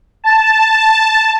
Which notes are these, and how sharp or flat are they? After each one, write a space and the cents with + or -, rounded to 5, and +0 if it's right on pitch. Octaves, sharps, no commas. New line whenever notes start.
A5 +0